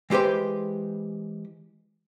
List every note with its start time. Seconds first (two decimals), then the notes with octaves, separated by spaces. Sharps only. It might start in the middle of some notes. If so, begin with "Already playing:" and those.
0.10 E3 G#3 G4 B4 C5